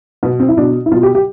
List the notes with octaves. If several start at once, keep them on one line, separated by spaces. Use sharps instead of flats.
B2 B3
C4
E4
B2 D4
E4
B2 F4
G4
G4